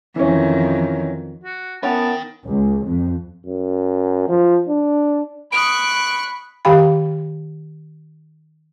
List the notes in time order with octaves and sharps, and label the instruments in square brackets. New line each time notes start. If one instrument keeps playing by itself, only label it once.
[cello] F2 D#3 [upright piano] E3 C#4
[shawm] F#4
[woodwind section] B3 [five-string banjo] C#4 E4 A#4 [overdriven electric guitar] D#4 G5 [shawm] A5
[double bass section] C#2
F2
[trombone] F#2
F3
D4
[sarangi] B5 [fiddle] C#6 F#6 [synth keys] D#6 D7
[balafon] D#3 G4 F5 G5 B5